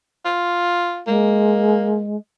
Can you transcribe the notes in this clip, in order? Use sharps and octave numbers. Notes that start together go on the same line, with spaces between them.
F4
G#3 A#3